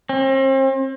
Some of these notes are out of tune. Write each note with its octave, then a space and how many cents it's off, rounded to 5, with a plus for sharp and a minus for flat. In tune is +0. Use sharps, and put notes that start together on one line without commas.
C4 +40